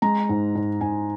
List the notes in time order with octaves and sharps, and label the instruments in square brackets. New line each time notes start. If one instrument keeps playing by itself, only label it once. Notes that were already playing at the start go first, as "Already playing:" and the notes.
[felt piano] G#3 A#5
G#2
G#2
G#2 G#5